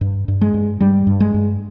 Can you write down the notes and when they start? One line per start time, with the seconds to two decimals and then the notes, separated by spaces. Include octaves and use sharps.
0.01 G2
0.28 G2
0.41 G#3
0.54 G2
0.80 G2 G3
1.07 G2
1.20 G#3
1.34 G2